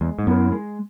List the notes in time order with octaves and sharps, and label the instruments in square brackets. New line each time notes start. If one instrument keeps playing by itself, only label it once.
[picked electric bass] E2 [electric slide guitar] G#3
[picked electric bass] G#2
[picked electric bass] F#2 [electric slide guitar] B3 E4 A#4
[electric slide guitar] G#3